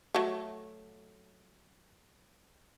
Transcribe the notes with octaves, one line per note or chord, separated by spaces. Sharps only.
F#3 A3